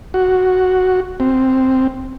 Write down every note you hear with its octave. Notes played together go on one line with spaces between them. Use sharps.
F#4
C4